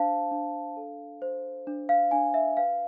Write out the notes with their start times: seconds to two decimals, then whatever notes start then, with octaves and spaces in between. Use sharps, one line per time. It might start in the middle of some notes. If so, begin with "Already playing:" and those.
Already playing: D4 C5 F5 A5
0.31 D4
0.77 A4
1.22 C5
1.67 D4
1.89 F5
2.11 D4 G#5
2.34 E5
2.57 B4 F5